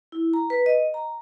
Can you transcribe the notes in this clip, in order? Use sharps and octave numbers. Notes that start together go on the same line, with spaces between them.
E4
A#5
B4
D#5
A#5